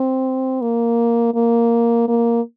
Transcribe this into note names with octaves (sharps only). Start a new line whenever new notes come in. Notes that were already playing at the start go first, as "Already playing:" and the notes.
Already playing: C4
A#3
A#3
A#3